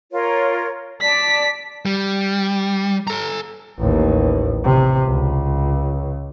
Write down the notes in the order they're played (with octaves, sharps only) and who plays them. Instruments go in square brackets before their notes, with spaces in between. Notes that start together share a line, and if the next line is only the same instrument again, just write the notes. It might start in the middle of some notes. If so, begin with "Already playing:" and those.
[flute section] F4 A#4 C#5
[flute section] D5 A5 [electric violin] B6
[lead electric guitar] G3
A4 A#5
[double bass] A1 D#2
C3
C#2